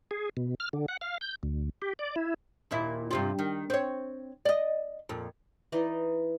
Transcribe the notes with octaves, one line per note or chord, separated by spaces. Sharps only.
G#4
B2
F6
D3
F#5
F5
G6
D2
G4
D5
E4
D#2 A#2 E4
G2 C3 F4
D#3
C4 C#5
D5 D#5
F2 A#2
E3 D#4 D5 D#5